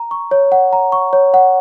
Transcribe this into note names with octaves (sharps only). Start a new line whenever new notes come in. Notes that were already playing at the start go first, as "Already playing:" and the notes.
Already playing: A#5
C#6
C#5
F#5
A#5
C#6
C#5
F#5